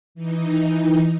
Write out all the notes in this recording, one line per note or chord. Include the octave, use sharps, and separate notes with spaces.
E3 D#4